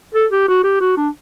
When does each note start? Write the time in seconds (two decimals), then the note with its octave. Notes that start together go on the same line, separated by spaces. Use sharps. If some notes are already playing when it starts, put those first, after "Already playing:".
0.14 A4
0.32 G4
0.48 F#4
0.64 G4
0.80 F#4
0.97 D4